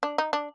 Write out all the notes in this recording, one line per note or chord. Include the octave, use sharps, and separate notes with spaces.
D4
D#4
D4